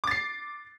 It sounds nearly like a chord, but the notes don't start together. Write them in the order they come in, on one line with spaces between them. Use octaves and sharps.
D6 A6 C7